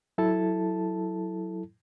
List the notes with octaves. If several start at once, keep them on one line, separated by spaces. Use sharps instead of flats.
F#3 E4 A4 A5